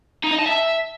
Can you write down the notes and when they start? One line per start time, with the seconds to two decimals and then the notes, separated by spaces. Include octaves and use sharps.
0.24 D#4
0.31 D#5
0.39 A5
0.46 E5